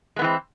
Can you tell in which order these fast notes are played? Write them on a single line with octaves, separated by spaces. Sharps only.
G#3 B3 E3 C4